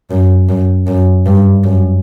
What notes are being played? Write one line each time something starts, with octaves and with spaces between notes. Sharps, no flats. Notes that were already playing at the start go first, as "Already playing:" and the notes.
F#2
F#2
F#2
G2
F#2